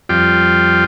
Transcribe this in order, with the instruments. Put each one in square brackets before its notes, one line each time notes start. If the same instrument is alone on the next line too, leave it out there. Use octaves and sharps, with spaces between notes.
[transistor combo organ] F2 G3 F4 G5